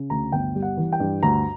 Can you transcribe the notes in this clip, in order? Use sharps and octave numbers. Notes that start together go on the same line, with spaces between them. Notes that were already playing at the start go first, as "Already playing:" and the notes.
Already playing: C#3
D2 A#5
G1 G5
G3
F#5
E3
G5
G2
D2 A#5